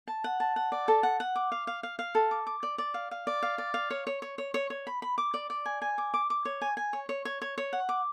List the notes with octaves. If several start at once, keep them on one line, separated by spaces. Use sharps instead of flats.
A5
F#5
A5
F#5
D5
A4
F#5
F#5
D6
F5
F5
F5
F5
A4
D6
D6
D5
D5
F5
F5
D5
F5
D5
F5
C#5
C#5
C#5
C#5
C#5
C#5
B5
B5
D6
D5
D5
G#5
G#5
D6
D6
D6
C#5
G#5
G#5
C#5
C#5
C#5
C#5
C#5
F#5
D6